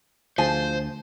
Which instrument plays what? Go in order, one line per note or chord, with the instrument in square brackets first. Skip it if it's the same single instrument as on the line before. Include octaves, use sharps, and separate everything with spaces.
[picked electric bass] D2 [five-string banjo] F3 G#4 A5 [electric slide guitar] C5